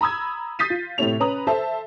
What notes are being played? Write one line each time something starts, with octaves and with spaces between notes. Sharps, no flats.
A#5 B5 D#6 E6 G#6
D#6 G6 A6 B6 C7 D#7
F4
A2 C3 A3 C#5 F7
C#4 B4 A#5 D#6 F#7
A4 C5 E5 A5